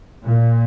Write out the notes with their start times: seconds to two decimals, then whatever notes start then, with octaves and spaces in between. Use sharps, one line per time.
0.22 A#2